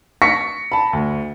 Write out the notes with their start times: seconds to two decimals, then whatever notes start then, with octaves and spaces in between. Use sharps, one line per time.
0.22 C#6 A#6 B6 C#7
0.72 A5 B5
0.93 D2